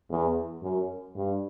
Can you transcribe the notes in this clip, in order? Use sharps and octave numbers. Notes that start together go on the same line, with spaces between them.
E2
F#2
G2